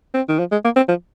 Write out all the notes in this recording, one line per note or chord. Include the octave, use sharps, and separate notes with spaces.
C4
D#3
F3
G#3
A#3
C4
F3